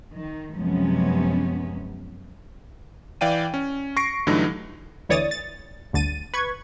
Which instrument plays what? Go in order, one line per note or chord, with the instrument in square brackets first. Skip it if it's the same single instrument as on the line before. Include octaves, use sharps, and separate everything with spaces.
[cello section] D#3
F#2 C3 F3 G#3 B3 C#4
[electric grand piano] E3 D5 F5 G5 D#7
C#4
C#6 A#6 C7 D7
G2 D3 E3 F#3 A3 D#4
[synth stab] D2 E3 C#5 D5 D#6 A6
A6
G1 D2 D3 A6 D#7
B4 C#6 G#6